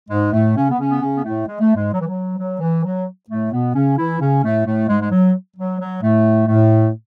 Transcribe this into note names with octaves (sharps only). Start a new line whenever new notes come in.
G#2 G#3
A2 A3
C#3 C#4
B3
C#3 C#4
B3
C#3 C#4
B3
A2 A3
G#3
A3
G#2 G#3
F#3
E3
F#3
F#3
E3
F#3
A2 A3
B2 B3
C#3 C#4
E3 E4
C#3 C#4
A2 A3
A2 A3
G#2 G#3
G#3
F#3
F#3
F#3
A2 A3
A2 A3